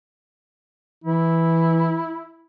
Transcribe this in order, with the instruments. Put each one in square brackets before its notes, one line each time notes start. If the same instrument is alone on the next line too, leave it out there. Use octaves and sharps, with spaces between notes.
[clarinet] E3 [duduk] E4